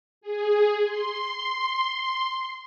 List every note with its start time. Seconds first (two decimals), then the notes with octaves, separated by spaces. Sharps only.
0.21 G#4
0.83 C6